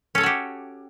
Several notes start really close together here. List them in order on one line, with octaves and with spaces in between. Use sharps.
C#4 A4 C#5 F#4 G4